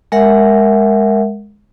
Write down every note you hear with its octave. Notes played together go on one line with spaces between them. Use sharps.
G#3 A#4 E5 F#5